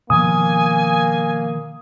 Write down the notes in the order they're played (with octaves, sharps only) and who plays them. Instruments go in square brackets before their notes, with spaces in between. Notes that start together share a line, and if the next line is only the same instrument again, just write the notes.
[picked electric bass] B2 D#3 F3 [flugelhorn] A#3 [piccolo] G#5 [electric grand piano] D#6